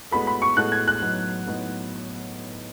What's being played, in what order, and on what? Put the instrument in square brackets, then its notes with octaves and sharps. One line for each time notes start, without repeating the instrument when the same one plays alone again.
[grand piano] A2 G#3 B3 F#4 A4 [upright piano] B5
[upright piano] B5
C#6
[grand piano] A2 G#3 B3 F#4 A4 [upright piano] F#6
[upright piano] G#6
F#6
[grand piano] A2 F#3 B3 D#4
A2 F#3 B3 D#4